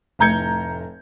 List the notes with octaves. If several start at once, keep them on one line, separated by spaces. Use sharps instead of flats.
F1 A2 A#5 G6 G#6 C#7